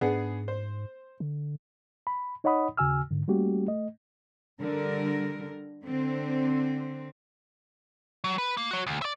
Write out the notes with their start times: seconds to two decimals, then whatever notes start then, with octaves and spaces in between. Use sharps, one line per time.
0.01 G#2 B3 D4 G#4
0.48 C5
1.20 D3
2.07 B5
2.44 D#4 C#5 D#5 F#5 B5 D#6
2.77 D#2 C#3 F#4 G#5 E6 F6
3.11 G#2 D3
3.28 G3 A3 A#3 C#4 F#4 G4
3.67 A3 D#5
4.61 D3 G3 A#4
5.83 D3 C4
8.24 F#3
8.38 B4
8.57 A#3
8.71 F#4 C#5
8.87 D2
9.02 D5 E5